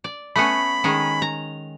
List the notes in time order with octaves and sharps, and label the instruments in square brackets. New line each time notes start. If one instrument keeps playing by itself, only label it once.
[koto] D5
[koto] A3 B3 C#4 [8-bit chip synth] B5
[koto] D#3 G#3 C#4
A#5